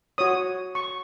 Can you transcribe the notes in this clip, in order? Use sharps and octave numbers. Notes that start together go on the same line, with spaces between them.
F#4 C#5 D#6
C#6